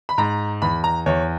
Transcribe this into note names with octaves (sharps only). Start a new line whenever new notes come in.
B5
G#2 A#5
E2 B5
A#5
E2 C#5